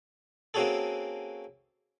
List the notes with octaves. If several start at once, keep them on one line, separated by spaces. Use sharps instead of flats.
A#3 C4 C#4 F#4 G#4 A4